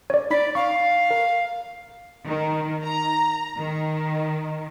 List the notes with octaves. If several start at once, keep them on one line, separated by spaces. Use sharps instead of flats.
C#5 D5
D#4 D5 B5 B6
F5 C#6
A#4
D#3
A#5
D#3